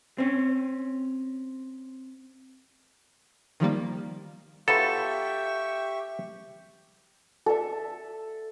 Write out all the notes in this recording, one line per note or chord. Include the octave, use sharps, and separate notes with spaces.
C4 C#4
D#3 F3 G3 A#3
F#3 B3 F4 G4 A4 E5 C#6
A4 E5